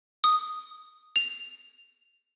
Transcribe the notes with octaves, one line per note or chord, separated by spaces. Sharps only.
D#6
F7